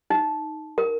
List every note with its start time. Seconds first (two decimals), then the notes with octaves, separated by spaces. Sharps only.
0.10 D#4
0.78 A#4